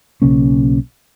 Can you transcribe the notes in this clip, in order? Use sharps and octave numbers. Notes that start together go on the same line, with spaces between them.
B1 C#3 A#3 C#4